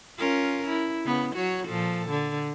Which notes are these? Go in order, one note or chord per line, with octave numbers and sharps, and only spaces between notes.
C#4 F4 A#4
E4
C#3 B3
F#3 F#4 C#5
A#2 F3 A4
D3